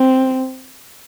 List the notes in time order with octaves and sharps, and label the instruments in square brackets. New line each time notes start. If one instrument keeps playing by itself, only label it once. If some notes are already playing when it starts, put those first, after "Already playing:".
Already playing: [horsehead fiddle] C4